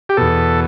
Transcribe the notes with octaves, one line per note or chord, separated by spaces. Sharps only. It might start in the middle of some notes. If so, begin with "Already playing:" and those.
G4
E2 B2 A4